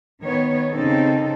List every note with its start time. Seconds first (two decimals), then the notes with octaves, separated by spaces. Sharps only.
0.22 D#3 B3 C#5
0.71 C#3 C4 D#4 A4